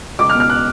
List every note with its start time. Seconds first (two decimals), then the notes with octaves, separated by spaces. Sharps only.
0.19 C#2 D6
0.29 F6
0.35 B2
0.40 F6
0.50 F#6